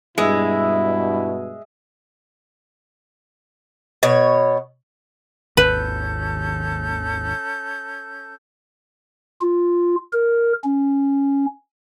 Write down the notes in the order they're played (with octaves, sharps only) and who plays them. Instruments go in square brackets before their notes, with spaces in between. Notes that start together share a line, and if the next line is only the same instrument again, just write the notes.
[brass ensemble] G2 B2 [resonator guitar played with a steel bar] G#3 [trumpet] E4 [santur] G#4 D#5 E5
[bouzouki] B2 C#5
[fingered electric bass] G#1 D#2 [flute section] C#4 A4 G6 [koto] B4
[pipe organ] F4
A#4
C#4